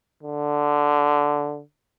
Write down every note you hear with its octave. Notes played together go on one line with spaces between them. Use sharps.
D3